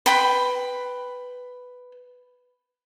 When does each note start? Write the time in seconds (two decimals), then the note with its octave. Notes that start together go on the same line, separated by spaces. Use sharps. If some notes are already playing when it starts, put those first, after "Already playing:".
0.06 B4 G5 B5 C6